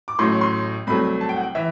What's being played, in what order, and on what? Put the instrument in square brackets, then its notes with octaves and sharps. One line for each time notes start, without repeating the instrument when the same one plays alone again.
[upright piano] D6
A1 A2 F#3 A3 C6
C6
C2 C3 F#3 A3 B5
A5
G5
F#5
G5
E3 E5